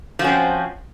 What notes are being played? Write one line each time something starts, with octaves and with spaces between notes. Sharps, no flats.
F3 C4 C#4 F#4